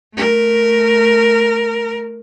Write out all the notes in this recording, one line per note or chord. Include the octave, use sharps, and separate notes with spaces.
A3 A#4